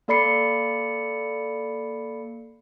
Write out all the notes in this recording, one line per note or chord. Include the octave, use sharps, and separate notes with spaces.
A#3 A4 D5 B5 C7 C#7